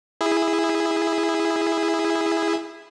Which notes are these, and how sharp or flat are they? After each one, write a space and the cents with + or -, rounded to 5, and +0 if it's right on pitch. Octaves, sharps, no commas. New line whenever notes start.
E4 +0 G#4 -15